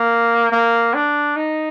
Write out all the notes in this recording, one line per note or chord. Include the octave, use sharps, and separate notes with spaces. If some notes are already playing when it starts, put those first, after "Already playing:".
Already playing: A#3
A#3
D4
D#4